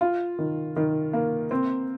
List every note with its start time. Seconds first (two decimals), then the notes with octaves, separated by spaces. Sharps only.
0.01 F4
0.39 D#3
0.76 D#3
1.13 A#3
1.51 C4